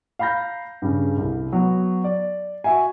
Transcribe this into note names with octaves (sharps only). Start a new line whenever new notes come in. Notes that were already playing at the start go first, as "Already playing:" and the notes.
F5 A#5 B5 G6 A#6
G2 C#3
C2
F#3 B3
D5
F#4 E5 G#5